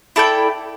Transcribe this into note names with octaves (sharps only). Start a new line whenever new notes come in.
E4 A4 D5 G5